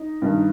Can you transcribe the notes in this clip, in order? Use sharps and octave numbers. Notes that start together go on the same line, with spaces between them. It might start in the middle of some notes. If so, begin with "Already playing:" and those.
Already playing: D#4
G2 D#3